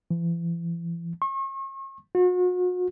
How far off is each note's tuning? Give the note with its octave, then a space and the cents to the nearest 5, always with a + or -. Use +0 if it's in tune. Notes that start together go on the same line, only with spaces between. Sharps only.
E3 +40
C#6 -40
F#4 -40